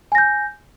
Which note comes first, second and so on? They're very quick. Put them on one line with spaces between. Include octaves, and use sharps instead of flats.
G#5 A#6 G6